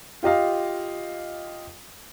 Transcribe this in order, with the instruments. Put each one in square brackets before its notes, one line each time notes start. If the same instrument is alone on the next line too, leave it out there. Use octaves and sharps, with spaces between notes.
[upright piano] F4 G4 D#5 F5